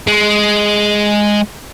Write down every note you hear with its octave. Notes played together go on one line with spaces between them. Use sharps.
G#3